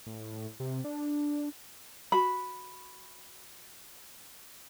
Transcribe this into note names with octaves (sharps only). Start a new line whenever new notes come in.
A2
C3
D4
F#4 B5